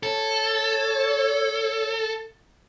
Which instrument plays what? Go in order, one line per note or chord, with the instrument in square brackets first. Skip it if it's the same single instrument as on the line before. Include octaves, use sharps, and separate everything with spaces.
[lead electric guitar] A4 [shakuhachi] C#5